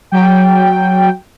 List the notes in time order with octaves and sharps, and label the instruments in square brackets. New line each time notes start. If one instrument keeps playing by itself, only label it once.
[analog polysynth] F#3 G5